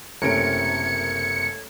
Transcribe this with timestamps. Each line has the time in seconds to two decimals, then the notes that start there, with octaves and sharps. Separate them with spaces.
0.22 F#1 C3 A3 C#4 A#4 G#6 C#7 D7